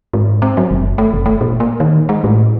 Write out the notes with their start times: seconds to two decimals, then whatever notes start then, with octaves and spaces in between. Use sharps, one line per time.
0.13 G#2
0.42 C4
0.57 F#3
0.71 F#1
0.98 A3
1.14 F#1
1.26 A3
1.41 A#2
1.60 A#3
1.80 D#3
2.09 G#3
2.24 A2